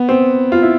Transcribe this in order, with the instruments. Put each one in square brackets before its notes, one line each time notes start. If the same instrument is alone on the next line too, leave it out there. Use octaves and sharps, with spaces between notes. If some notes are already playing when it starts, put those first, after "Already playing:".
Already playing: [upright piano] B3
C4
F4
E4